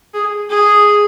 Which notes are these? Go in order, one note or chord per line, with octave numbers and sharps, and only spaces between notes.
G#4
G#4